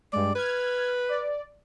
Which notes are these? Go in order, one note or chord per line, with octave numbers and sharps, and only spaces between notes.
G2 G#3 D5
B4 F6 G#6
D5